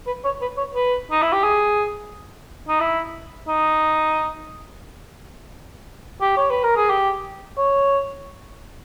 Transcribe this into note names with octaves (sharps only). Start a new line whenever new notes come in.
B4
C#5
B4
C#5
B4
D#4
E4
G4
G#4
D#4
E4
D#4
G4
C#5
B4
A#4
G#4
G4
C#5